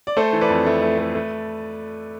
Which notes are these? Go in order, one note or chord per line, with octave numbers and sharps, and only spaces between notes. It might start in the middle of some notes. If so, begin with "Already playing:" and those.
D5
A3 A4 C5
E3
B4 D5
F2
A3
A3
A3
A3